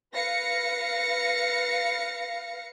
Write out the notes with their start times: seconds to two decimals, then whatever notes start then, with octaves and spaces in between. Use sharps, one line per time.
0.12 B4 F5 A#6 C#7